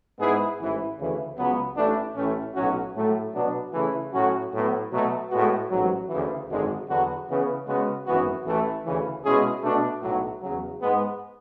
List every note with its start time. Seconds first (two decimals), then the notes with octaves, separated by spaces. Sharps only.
0.19 G#2 G#3 B3 E4 G#4
0.58 A1 G#2 E3
0.98 D2 C#3 E3
1.37 C#2 C#3 F#3 B3
1.76 A1 A2 E3 A3 D4
2.15 A1 A2 E3 A3 C#4
2.55 B1 A2 F#3 C#4 F#4
2.95 A2 F#3 A3
3.34 B2 F#3 B3 D4
3.73 C#3 E3 A3 E4
4.13 A2 F#3 C#4 F#4
4.52 A2 F#3 B3
4.91 B2 F#3 A3
5.30 A2 G#3 B3 F#4
5.70 A1 G#2 F#3
6.09 D2 C#3 E3
6.49 G#1 F#2 D3 G#3
6.88 E2 D3 F#3 B3 F#4
7.28 C#3 E3 B3
7.67 C#3 G#3 B3 F#4
8.06 G#1 F#2 E3 B3 F#4
8.45 A1 A2 E3 A3
8.85 D2 C#3 E3
9.25 B2 G#3 C#4 E4 G#4
9.63 B2 A3 D4
10.03 B1 A2 F#3
10.43 E2 C#3 F#3
10.82 G#2 G#3 B3